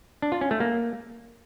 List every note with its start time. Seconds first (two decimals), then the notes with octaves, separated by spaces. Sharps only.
0.22 D4
0.32 F4
0.41 C#4
0.51 A3
0.60 A#3